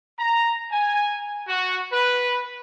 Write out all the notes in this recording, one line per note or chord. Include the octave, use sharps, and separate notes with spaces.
A#5
G#5
F#4
B4